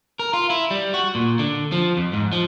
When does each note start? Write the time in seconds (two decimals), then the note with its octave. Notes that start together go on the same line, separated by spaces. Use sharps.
0.19 A#4
0.34 F4
0.50 E4
0.71 G3
0.94 F#4
1.15 A#2
1.39 D3
1.72 F3
1.97 F2
2.13 G#2
2.33 F3